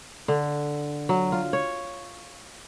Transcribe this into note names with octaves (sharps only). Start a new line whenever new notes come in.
D3
F#3
F4
C#5